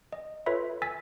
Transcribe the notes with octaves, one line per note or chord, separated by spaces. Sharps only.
D#5
F4 A4 B4 C#5 E5 B5
G#5 E6 A6 B6